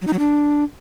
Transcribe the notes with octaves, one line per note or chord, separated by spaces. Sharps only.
F#3
D#4
F#3
D4